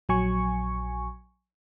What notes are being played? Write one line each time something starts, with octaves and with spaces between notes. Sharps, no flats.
A#1 F#3 G#5 C#6